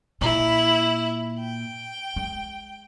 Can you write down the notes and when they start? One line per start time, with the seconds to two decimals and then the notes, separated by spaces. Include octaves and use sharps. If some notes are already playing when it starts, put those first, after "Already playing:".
0.21 A#2 E4
1.41 G5
2.16 G#3